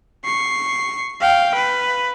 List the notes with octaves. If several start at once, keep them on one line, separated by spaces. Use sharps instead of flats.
C#6 C7
F5 G5
B4